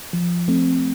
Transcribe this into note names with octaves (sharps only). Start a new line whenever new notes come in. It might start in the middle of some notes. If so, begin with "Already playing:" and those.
F3
A3 C4